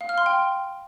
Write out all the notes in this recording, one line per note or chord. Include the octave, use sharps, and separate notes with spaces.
F5
F6
C6
G5